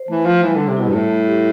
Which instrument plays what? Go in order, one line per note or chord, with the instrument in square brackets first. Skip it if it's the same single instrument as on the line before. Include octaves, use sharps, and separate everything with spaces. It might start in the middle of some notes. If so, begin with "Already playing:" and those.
Already playing: [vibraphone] C5
[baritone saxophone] E3 [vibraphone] A3
[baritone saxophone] F3 [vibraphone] F4
[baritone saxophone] E3 [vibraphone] G3
[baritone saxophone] D3 [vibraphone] G3
[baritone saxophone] C3
[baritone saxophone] B2 [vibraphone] E4
[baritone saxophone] G2
[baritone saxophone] A2 [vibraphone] A3
[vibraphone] A3
G4